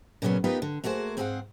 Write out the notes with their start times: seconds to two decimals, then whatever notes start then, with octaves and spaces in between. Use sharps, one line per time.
0.22 A#2 C#3 F#3 G3 B3 C#4
0.44 B3 D#4 F4 G4 A#4 B4
0.62 D3
0.84 A3 A#3 F#4 G#4 C5
1.17 G#2 C4 G#4 A#4 F5 F#5